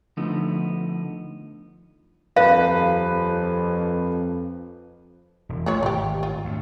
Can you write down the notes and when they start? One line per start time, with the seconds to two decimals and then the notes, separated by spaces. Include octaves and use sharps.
0.17 D3 F3 A3 B3 D#4
2.37 D#1 F2 B4 F5
5.49 E1
5.66 A1 F3 A3 F4 C#5
5.83 G#1 F4 G4
6.23 F4
6.45 D2